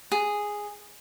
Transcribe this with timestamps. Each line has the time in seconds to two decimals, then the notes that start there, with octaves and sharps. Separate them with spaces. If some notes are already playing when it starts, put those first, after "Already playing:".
0.12 G#4